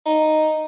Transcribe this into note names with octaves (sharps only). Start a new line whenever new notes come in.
D#4